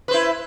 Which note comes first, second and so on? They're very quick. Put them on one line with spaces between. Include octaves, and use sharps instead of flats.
B4 C5 E4